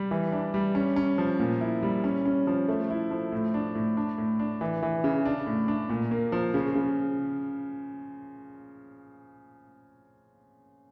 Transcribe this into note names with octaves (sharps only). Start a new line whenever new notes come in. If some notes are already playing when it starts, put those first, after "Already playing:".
Already playing: G3
E3
D4
G3
C#4
C#4
F3
A#2
E4
G3
C#4
C#4
F3
A3
E4
F3
A2
D4
A2
D4
A2
D4
E3
E3
C#3
D4
A2
D4
A#2
A#3
F3
C#3
C#3